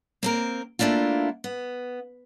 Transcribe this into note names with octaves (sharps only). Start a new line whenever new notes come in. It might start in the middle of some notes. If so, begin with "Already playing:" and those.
A#3 C4 A#4
A3 A#3 D4 E4 F4
B3